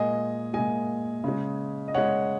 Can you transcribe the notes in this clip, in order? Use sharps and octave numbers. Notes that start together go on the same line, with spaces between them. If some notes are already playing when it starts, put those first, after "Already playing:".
Already playing: A#2 G#3 D#5 G#5
A#2 G#3 D#5 G#5
C#3 G#3
D#5
C#3 G#3 C#5 F#5